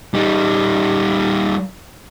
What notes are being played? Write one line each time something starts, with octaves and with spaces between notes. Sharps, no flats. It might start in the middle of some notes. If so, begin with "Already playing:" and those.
G3 D#4